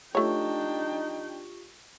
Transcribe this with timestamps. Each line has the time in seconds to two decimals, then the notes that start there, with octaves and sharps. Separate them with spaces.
0.15 A3 D4 D#4 F4 G4 C#5 G5 C#6